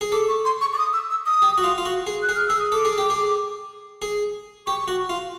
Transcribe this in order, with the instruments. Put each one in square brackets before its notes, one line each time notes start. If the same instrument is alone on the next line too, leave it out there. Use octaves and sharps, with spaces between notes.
[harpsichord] G#4
[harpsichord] A4 [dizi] D6
[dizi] C#6
C6
C#6
D6
D#6
E6
E6
D#6
[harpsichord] G4
F#4
F4
F4
F#4
G#4
[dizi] F#6
[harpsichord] G#4
[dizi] F6
[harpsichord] G#4 [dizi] E6
[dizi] D#6
[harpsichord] A4 [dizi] D6
[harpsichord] G#4
G4
G#4
G#4
[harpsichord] G4 [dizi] C#6
[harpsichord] F#4
F4